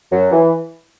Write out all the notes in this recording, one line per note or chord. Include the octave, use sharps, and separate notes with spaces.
F#2 F#3
E3